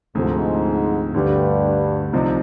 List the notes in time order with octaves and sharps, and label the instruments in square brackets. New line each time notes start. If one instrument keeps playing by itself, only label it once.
[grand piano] D2 C3 F3 [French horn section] G#2
[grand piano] D2 D3 G3 [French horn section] G2
[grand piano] C2 C3 F3 C4 D#4